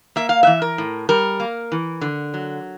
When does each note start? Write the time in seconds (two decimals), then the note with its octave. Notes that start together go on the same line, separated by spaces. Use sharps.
0.16 A#3 E5
0.29 F5
0.43 E3 E5
0.62 A#4
0.78 A2
1.09 G3 A#4
1.40 A#3
1.72 E3
2.01 D3
2.34 F#3